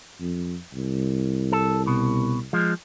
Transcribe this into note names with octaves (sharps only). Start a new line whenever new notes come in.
F2
C2
A4
B2
F3 G#3